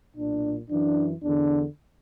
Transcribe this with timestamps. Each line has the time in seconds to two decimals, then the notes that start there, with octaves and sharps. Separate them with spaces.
0.16 B1 A#2 D4
0.70 F#2 E3 D4
1.24 E2 D3 D4